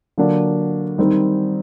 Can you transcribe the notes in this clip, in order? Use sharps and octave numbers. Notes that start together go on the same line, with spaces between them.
D3 F#3 A#3 D4 F4
D#3 G3 C4 D#4